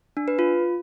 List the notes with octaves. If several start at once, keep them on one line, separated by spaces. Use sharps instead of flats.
D4
B4
F4